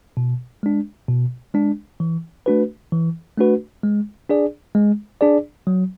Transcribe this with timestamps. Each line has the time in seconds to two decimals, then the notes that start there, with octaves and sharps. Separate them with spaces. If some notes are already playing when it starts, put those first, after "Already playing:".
0.17 B2
0.63 G#3 D4
1.08 B2
1.54 G#3 D4
2.00 E3
2.46 A3 D4 F#4 B4
2.92 E3
3.37 A3 D4 F#4 B4
3.84 G#3
4.29 D4 G#4 D5
4.75 G#3
5.21 D4 G#4 D5
5.67 F#3